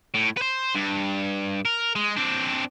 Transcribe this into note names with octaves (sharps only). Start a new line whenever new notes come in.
A2
B4 C5
G2
A#4
G#3
C4 D4